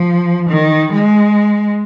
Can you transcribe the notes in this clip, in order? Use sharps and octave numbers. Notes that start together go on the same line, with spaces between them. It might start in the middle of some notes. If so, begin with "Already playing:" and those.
Already playing: F3
D#3
G#3